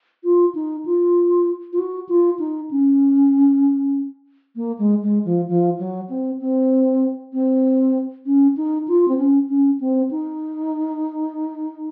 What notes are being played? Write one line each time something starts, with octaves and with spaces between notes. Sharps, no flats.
F4
D#4
F4
F4
F#4
F4
D#4
C#4
A#3
G#3
G#3
F3
F3
F#3
C4
C4
C4
C#4
D#4
F4
C4
C#4
C#4
C4
D#4